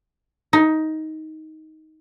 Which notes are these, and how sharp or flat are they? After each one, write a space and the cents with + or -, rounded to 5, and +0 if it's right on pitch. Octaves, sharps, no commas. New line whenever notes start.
D#4 +15